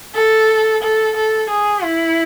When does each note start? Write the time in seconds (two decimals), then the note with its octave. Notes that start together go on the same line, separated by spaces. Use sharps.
0.15 A4
0.83 A4
1.16 A4
1.50 G#4
1.83 E4